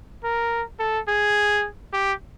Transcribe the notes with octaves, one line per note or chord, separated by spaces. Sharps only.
A#4
A4
G#4
G4